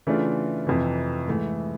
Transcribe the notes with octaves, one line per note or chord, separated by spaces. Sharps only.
C#3 E3 A3 D4 F4
F2 C3 E3
G#2 E3 A3